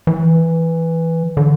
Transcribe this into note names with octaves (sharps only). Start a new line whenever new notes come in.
E3
D3